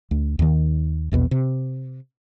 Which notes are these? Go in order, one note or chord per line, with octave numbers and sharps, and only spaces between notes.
D2
D#2 D#3
A#1 E2 B2
C3